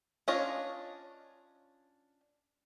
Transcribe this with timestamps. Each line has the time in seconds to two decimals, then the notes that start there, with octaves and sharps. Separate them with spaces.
0.28 C#4 D4 F4 C#5 D#5